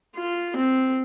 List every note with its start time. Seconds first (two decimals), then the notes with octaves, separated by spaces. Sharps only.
0.16 F4
0.56 C4